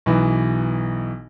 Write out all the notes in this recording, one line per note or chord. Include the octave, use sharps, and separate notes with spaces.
B1 B2 E3